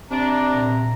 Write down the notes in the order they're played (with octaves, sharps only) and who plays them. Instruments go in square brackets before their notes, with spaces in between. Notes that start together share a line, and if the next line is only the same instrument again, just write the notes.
[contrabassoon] C3 [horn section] D4 [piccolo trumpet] A#5
[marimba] A#2